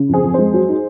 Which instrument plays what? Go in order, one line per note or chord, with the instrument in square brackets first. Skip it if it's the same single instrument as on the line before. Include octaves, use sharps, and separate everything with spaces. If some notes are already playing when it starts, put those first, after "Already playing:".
Already playing: [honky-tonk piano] C#3
F2 G#4 C5
F2
G#3 G#4 C5
F#3
D#4